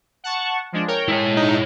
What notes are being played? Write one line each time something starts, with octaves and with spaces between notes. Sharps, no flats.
F#5 A5 C#6
F3 G#3 D4
A#4 C#5 G5
G#3 E4 C#5
D#4